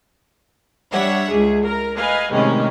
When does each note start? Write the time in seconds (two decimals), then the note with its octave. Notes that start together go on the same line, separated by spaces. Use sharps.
0.90 G3 D4 C#5 E5 F#5
1.31 C#2 G#4
1.63 A#4 A#5
1.96 B4 D#5 F5 G#5
2.31 A2 C3 D#3 G3 G#3 C#4